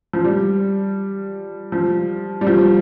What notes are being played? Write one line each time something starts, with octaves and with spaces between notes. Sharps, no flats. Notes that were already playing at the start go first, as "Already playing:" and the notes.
F3
G3
F3
G3
F3